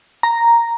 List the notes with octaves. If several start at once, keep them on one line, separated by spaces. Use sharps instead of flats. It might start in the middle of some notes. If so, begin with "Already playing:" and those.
A#5